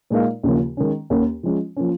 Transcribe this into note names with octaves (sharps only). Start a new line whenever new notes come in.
A#2 G#3 D#4 A#4 F5
D#2 C#3 F3 A#3
D#3 G#3 C#4
D#2 D#3 A#3 C#4
F3 G#3 C#4
F3 A#3 C#4